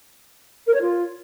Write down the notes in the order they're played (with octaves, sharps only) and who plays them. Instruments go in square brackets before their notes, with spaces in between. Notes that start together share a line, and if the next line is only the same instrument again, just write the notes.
[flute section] A#4
C#5
F4